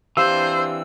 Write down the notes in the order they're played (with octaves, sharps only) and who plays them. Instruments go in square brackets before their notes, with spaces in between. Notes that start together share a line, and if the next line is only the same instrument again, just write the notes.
[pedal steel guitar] E3 C4 D4 [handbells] G4 F5 [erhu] C5 [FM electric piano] E6